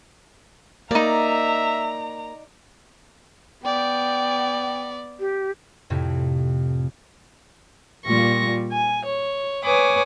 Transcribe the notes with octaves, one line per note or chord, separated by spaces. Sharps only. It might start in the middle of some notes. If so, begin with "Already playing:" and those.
A#3 D#4 D5 E5 A#5
B3 D5 G5
G4
F2 A2 C3 E4
A#2 G3 F4 C#6 A#6
G#5
C#5
B4 C#5 G#5 D6 D#6